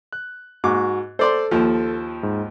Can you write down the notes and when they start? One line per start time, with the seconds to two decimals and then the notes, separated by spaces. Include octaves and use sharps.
0.13 F#6
0.64 G#2 F#4 C#6 D6
1.19 A4 C5 D5 C6
1.51 D#2 F3
2.23 G#2